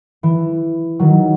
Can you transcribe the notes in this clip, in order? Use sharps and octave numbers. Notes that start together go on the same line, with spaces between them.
E3
D#3 F#3